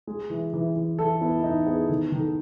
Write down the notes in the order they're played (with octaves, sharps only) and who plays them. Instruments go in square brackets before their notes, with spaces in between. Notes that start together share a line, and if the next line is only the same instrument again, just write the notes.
[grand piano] G#3 [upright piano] G#4
[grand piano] E3
E3
E3
[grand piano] E3 [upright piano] A4
[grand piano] B3 [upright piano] E4
[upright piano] E4
[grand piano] E3 [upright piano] D#4
[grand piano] B3 [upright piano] G#4
[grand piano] D#3 [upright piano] A4
[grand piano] D#3
[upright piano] A4